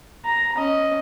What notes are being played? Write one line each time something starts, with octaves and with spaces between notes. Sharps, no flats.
A#5
C#4 D#5